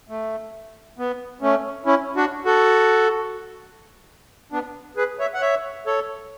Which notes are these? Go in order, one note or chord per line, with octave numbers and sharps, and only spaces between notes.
A3
B3
A3 C#4
C#4 E4
D4 F#4
F#4 A4
B3 D4
G#4 B4
C#5 E5
F#5
C#5 E5
A4 C#5